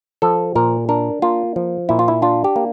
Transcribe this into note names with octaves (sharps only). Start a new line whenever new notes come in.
F3 A4
A#2 A#4
D4 A#4
A#3 F4
F3
A#2 E4
F4
E4
D4 F4
G4
A#3